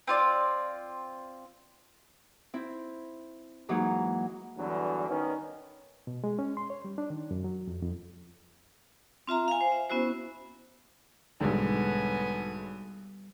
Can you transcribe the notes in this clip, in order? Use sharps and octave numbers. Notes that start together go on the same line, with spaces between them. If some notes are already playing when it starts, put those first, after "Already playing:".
C4 F4 D5
C4 E4
G#2 E3 F#3 A#3 D#4
E2 G2 D3 E3 F#3
D#3 B3 C#4
B2
G#3
C#4
C6
C#5
G3
D4
D#3
F#2
F#3
F2
F2
C4 F4 E5 A#5
F5 G#5
C5
E5
B3 C#4 E4 F#4 C5
B1 G#2 D3 G3 B3 G#5